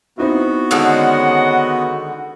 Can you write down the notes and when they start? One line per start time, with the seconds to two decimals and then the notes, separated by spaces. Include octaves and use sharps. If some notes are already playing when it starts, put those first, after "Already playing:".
0.18 B3 C4 D#4 E4 F#4
0.71 D3 D#3 G#3 C#4 D#5 F#5